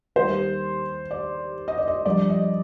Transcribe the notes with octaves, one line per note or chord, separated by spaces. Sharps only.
D#2 D#3 G3 C5
D5
D#5
D5
D#5
G2 F3 D5
D#5